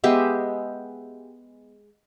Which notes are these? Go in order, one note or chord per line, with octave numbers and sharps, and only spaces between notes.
G#3 B3 G4 E5